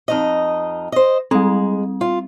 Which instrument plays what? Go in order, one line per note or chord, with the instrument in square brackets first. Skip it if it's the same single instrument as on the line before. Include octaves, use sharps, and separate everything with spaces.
[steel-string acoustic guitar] F2 D#4 D#5
C5 D#5
[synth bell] G3 C4 [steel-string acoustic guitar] G#3
[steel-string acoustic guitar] F4